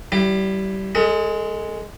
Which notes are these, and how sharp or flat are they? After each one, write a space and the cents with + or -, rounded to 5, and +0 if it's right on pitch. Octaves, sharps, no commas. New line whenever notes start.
G3 -30 E4 +0 D6 +30
G#3 +0 A4 +40 D#6 +30